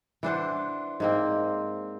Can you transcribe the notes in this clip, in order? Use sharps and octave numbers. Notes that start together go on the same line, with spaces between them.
E3 D4 C5 F#5
G#2 A#3 C4